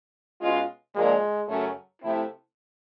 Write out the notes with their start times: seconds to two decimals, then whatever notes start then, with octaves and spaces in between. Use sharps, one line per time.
0.41 B2 G#3 C#4 F4
0.95 A#2 F3 G#3 A#3 D4
1.48 F#2 C#3 F#3 A3 C#4
2.02 C3 F3 A3 C4 E4